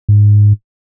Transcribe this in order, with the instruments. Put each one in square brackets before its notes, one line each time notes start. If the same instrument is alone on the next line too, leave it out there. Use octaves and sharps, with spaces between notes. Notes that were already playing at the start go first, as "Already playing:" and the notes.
[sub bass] G#2